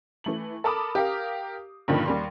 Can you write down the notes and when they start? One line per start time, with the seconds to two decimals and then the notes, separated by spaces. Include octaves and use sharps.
0.24 E3 A3 F#7
0.64 A4 A#4 A5 B5 D6 D#6
0.95 G4 A#4 F5
1.88 G2 A#2 D3 D#3 F3
2.06 D#2 G3 C6